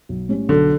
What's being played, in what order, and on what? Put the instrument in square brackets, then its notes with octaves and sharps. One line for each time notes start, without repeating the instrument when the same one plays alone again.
[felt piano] B1
A2 G3 C#4
[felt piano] B1 [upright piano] D3